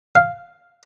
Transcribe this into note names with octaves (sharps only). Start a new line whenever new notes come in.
F5